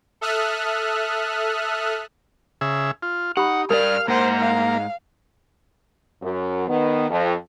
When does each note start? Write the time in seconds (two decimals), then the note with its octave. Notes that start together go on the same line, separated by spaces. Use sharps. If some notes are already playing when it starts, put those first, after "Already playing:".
0.21 A4 E5 D#6 F6 F#6
2.61 C#3 G#4 E5
3.03 F4
3.37 D#4 G4 F#5 B5
3.70 G2 G#4 A#4 D5 F5 F6
4.08 G#2 A#3 C5 F#5
4.40 F5
6.22 F#2
6.68 D#3 B3
7.10 F2